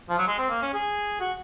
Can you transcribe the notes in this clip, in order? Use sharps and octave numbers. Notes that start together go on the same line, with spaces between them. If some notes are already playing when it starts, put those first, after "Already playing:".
F3
F#3
G#3
C4
A#3
C#4
G#4
F#4